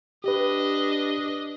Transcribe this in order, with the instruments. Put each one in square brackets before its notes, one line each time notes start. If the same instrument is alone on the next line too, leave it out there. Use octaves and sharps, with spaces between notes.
[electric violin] D4 D#5 [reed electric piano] G4 B4